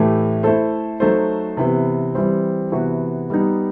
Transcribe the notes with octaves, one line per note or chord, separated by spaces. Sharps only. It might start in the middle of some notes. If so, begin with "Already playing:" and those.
Already playing: A2 E3 A3 E4 G4
A3 E4 A4 C5
F#3 A3 D#4 A4 C5
C3 E3 B3
E3 G3 C4
C3 E3 B3 F#4
G3 B3 D#4